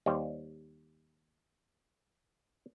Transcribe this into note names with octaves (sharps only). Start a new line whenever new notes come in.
D#2 G3 C5